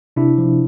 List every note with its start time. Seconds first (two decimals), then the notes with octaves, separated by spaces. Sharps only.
0.16 C3 D4 E4
0.38 F3